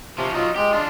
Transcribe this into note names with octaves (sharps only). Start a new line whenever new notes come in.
C3 F3 C#4
F#3 D#4 F4
G#3 G4
D4 F4